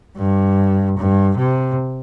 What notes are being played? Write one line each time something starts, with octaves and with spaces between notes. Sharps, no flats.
G2
G2
C3